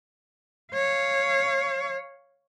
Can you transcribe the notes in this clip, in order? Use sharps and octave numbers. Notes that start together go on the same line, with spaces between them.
C#5 F5